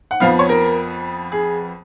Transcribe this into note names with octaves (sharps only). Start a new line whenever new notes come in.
F#5
F2 F3 B3 F5
C#5
A#4
G#4